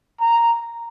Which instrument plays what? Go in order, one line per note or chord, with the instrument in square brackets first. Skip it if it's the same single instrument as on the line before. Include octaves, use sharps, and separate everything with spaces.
[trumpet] A#5